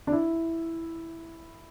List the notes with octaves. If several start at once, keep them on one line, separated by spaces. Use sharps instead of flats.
D4
E4